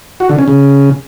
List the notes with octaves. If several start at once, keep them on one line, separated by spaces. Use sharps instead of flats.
F#4
D3
C#4
C#3